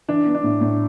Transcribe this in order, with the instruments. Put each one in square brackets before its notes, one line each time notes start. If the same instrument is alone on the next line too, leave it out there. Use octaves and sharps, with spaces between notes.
[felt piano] E3 [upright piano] D4
[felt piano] B3
[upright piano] D4
[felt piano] A2
A2